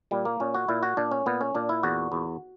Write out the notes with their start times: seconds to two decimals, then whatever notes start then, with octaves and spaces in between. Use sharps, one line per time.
0.11 A#2 G3
0.25 A#3
0.40 A#2 C#4
0.54 F#4
0.68 A#2 E4
0.83 F#4
0.97 A#2 D4
1.12 C#4
1.26 A#2 B3
1.41 C#4
1.55 A#2 D4
1.69 E4
1.83 E2 F#4
2.12 E2